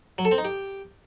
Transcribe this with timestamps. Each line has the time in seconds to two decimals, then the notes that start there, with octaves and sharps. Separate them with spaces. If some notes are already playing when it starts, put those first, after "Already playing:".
0.18 F#3
0.25 A4
0.31 C4
0.38 D#4
0.45 G4